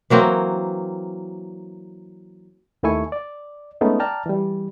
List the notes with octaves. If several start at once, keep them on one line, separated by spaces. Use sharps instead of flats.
E3 F#3 A#3 C4
D#2 D#3 A3 E4 G#5 C#6
D5
G#3 A3 B3 C#4 D#4
D5 G5 A5 A#5 F6
E3 G3